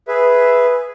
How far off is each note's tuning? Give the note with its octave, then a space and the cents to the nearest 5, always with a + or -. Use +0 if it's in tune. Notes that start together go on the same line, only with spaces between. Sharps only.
G#4 +0 B4 +0 E5 +0